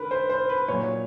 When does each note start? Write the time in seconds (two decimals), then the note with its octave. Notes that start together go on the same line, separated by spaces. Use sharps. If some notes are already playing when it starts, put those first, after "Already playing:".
Already playing: D#3 A#4 B4
0.11 C5
0.30 C5
0.49 B4
0.68 A#2 F#3 C#5